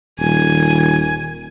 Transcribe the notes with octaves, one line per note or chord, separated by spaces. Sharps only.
D#1 D#3 G#5